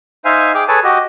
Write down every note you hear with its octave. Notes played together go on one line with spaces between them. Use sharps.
D#4 C5 E5 F5 G#5
G#4 G5 D6
G#4 A4 B4 C#5 G#5 A5
F#4 G4 D#5